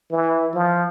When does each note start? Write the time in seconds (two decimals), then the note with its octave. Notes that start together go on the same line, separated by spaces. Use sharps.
0.11 E3
0.53 F3